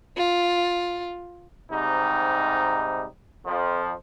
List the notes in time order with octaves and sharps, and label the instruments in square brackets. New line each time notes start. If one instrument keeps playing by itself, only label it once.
[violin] F4
[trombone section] G#2 C3 G3 D#4
F2 F3